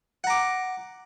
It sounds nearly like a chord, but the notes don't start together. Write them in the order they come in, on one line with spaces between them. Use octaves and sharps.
F#5 A#5 D6